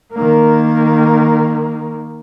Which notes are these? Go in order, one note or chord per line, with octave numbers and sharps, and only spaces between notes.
D#3 A#3